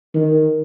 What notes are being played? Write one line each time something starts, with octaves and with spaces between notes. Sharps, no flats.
D#3